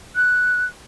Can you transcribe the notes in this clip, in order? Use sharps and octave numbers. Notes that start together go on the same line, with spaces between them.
F#6